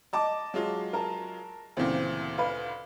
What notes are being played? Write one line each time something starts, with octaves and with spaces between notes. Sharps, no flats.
D#5 A5 D6
F#3 G#3 F4
A#4 A5
D2 A#2 C#3 E3 C4
B4 F5